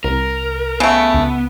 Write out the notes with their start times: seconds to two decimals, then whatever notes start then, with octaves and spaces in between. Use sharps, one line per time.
0.04 C2 A#4
0.80 C#3 A3 B3 D7
1.14 C#2